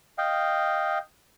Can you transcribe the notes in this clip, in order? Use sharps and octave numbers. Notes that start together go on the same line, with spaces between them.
D#5 F5 G5